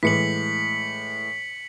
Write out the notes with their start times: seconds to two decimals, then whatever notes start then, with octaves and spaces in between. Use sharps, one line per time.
0.03 A2 E3 G#3 B6 C#7 F#7